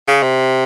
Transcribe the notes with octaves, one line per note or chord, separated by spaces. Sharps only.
C#3
C3